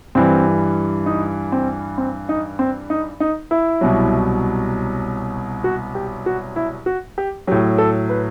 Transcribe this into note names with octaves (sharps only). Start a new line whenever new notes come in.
G2 E3 G3 C4
D#4
C4
C4
D#4
C4
D#4
D#4
E4
C2 B2 F#3
F#4
G4
F#4
E4
F#4
G4
A2 F#3 G4
A4
B4